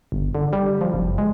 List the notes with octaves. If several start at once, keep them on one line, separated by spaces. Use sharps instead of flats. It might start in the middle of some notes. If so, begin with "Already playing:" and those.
G1
D3
G3
F3
F#1
G#3